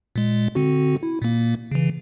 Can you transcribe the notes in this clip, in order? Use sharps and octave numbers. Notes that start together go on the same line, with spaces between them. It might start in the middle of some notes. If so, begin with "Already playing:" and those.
A#2 G#3
D3 C4 F#4
E4
A#2 A#3
C#3 E3